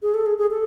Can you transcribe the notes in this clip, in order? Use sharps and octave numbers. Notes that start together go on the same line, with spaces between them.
G#4
A4
G#4
G#4
A4